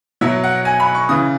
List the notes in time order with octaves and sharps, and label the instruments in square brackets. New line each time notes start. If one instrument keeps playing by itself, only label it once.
[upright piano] B2 F#3 E5
F#5
G#5
B5
C#6
C#3 E3 D#6